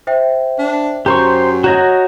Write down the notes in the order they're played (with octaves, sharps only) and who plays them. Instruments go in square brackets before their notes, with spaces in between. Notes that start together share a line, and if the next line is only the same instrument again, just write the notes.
[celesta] C5 E5 G5
[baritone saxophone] D4
[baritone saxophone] F#2 [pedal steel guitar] G4 C5 C#6 [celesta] A#5 C6 G6
[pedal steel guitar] F#4 C#5 D#5 [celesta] A#5 G6 A#6